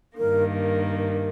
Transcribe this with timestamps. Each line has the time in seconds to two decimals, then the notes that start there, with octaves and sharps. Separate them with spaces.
0.18 G2 D#3 A#3 A#4